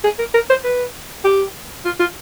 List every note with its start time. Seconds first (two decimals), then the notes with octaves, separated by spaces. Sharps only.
0.04 G#4
0.19 A#4
0.34 A#4
0.50 C5
0.64 B4
1.24 G4
1.85 F4
2.00 F4